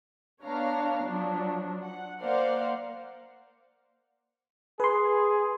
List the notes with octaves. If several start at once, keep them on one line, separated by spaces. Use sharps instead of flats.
B3 D4 C#5 F5 A#5
F3 F#3 D4
F#5
A#3 A#4 C5 D5 F5 F#5
G#4 B4 C6